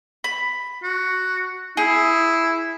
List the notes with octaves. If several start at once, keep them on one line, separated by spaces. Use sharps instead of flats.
B5
F#4
E4 G#4